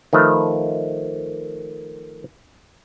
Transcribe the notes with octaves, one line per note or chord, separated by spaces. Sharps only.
D#3 F3 A3 B4